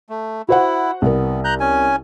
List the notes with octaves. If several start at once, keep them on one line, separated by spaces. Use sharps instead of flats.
A3
E4 F#4 C5 F#5
C2 B3 A#4
A#5 F#6 G6
C#4 G#5